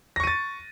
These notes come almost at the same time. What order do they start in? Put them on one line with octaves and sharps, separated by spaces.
A#6 C#6 D#7 A6